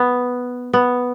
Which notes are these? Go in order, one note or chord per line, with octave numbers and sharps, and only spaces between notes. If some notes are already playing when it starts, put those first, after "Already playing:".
Already playing: B3
B3